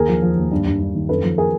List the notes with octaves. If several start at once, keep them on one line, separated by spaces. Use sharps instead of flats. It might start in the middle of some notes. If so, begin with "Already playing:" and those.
Already playing: D#2 G#4 A#4
F3
F3
D#2
G2
G2
G2
D#3
F#2 A4 B4
F3
G#4 A#4